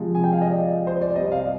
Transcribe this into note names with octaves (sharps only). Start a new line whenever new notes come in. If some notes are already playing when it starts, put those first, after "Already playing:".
Already playing: C3 F3 G#3
G#5
G5
F5
D#5
D5
C5
D5
C3 G3 D#5
F5